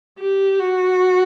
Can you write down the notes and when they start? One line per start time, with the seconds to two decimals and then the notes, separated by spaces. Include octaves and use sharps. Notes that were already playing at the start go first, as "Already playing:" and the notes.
0.19 G4
0.60 F#4